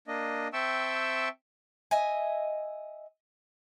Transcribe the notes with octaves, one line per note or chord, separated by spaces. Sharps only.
A#3 D4 D#5
C4 E5 G5 A5 C#6 E6
D#5 E5 G#5